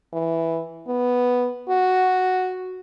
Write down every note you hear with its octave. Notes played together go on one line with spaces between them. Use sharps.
E3
B3
F#4